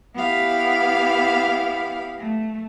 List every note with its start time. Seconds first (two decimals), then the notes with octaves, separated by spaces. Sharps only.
0.15 B3 E4 G4 F5 B5
2.18 A3